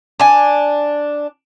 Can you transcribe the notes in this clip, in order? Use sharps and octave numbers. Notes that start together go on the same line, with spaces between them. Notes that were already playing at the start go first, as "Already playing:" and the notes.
D4 G#5